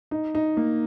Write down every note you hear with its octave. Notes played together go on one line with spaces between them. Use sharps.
D#4
D#4
A#3